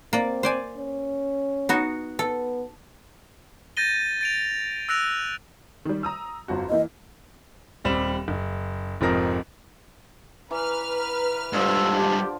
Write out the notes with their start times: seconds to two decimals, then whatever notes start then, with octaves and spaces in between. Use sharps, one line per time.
0.13 A#3 C4 D5
0.43 C5 D5 G#5
0.77 C#4
1.69 B3 D#4 F#4
2.19 B3 A4
3.77 G6 A6 A#6 D#7 G7
4.21 A6 D7 F7
4.89 E6 F#6 A#6 D7 F7
5.85 D#3 G3
6.03 A#5 D#6 E6
6.48 G1 F2 F#4
6.70 E3 A#3 E4 D#5
7.85 D#1 G3 C4 E7
8.28 F#1
9.01 F1 G#2 F3 C4 A#4 A#6
10.51 E3 B4 A#5 F6
11.53 G#2 D3 F3 G3 E6
11.97 G4